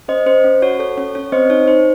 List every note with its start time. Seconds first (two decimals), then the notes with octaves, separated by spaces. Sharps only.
0.08 C#4 C5 D#5
0.26 C#4 C5
0.44 C#4
0.62 F#4 C#5
0.79 A4 C#5
0.97 C#4 C#5
1.15 C#4 C#5
1.32 C4 C5 D#5
1.50 D#4 C#5
1.67 D#4 C5